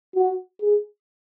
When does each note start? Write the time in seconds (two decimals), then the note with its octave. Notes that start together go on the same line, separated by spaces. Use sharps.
0.15 F#4
0.61 G#4